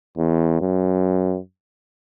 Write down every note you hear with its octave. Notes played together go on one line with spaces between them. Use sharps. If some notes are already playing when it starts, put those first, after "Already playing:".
E2
F#2